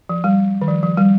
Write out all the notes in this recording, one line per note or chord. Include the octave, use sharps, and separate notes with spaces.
F3
G3
D#3
F3
F3
G3